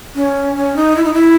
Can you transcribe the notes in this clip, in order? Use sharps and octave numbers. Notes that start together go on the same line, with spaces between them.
C#4
C#4
D#4
E4
D#4
E4